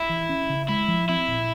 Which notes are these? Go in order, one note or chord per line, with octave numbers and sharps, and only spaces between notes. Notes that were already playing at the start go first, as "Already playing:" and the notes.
Already playing: E4
E3
C#4
C#3
G#3 E4
F3
C4 E4
A#2